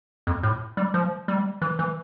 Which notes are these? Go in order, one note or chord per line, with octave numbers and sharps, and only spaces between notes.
F2
A2
G3
F3
G3
E3
E3